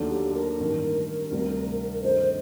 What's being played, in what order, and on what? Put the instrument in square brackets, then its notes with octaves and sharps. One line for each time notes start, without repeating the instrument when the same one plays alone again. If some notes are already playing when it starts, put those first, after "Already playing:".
Already playing: [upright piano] D#2 D3 F#3 A3 D4
[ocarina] G4
A#4
[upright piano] A1 G2 D#3
D2 C3 G3 D4
[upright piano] G2 D#3 A3 D#4 [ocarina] C5